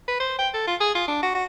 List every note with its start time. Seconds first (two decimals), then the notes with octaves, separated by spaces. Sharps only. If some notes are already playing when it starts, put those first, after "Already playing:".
0.08 B4
0.20 C5
0.39 G5
0.54 A4
0.67 F4
0.81 G#4
0.95 F4
1.08 D4
1.23 F#4
1.35 F#4